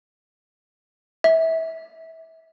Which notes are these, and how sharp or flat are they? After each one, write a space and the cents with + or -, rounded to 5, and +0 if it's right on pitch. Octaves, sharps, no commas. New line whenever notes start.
E5 -25